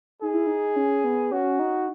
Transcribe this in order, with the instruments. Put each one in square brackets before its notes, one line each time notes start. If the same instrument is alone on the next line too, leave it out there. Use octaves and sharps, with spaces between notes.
[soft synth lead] D#4 [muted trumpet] G#4
[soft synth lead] E4
D#4
C#4
B3
[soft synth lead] C#4 [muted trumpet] F#4
[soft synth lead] D#4